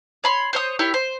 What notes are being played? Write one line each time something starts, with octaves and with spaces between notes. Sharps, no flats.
C#5 B5 C6
C5 C#5 D#6
E4 G4 A#4 C#5
C5